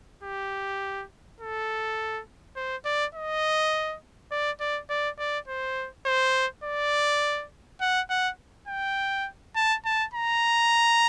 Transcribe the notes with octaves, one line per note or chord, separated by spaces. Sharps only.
G4
A4
C5
D5
D#5
D5
D5
D5
D5
C5
C5
D5
F#5
F#5
G5
A5
A5
A#5